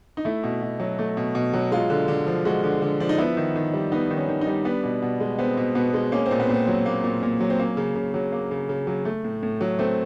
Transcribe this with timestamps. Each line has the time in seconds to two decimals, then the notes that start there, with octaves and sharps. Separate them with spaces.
0.17 D#4
0.25 A3 E4
0.43 B2
0.62 B2
0.80 F#3
0.99 A3
1.17 B2
1.35 B2
1.54 F#3
1.72 G#3 F4
1.90 D3
2.08 D3
2.27 F3
2.45 G#3 F#4
2.64 D3
2.82 D3
3.00 F3 D4
3.09 D#4
3.18 B3 E4
3.37 D#3
3.55 D#3
3.74 G3
3.92 B3 D#4
4.10 D#3
4.17 C#4
4.29 D#3
4.41 D#4
4.47 G3
4.65 B3 D4
4.83 B2
5.02 B2
5.20 G#3
5.39 B3 C4
5.57 B2
5.75 B2 B3
5.94 G#3
6.12 A#3 C#4
6.26 C4
6.31 A#2
6.40 B3
6.49 A#2 C4
6.67 F#3
6.86 A#3
7.04 A#2
7.22 A#2
7.41 F#3
7.50 C4
7.59 A#3 C#4
7.77 C#3
7.95 C#3
8.14 F#3
8.32 A#3
8.51 C#3
8.69 C#3
8.87 F#3
9.05 A3
9.24 A2
9.43 A2
9.61 F#3
9.79 A3 C4